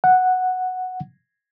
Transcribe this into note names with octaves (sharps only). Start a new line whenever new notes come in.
F#5